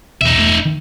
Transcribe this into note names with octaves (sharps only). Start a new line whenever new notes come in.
B1 E2 D#4 E5
E1 E2 A3
D#3